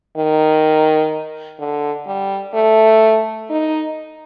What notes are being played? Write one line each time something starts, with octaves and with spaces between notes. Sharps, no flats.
D#3
D3
G3
A3
D#4